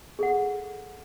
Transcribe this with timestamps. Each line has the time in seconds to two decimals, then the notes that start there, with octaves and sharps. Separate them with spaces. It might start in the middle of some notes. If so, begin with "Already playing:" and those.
0.19 G#4 A4 F#5